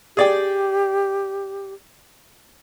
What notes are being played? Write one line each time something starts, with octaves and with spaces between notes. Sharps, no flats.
G4 G#4 D5 G5